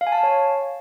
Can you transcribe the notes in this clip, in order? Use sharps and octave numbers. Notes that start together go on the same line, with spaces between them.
F5
G#5
A5
F5
C#5